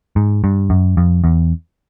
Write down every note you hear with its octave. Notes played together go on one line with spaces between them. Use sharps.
G#2
G2
F#2
F2
E2